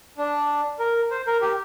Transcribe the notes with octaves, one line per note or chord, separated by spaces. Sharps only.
D4
A#4
C5
A#4
G4